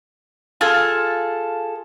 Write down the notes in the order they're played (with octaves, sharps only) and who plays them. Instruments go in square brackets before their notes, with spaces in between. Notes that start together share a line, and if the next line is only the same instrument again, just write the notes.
[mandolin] F4 G#4 A4 A5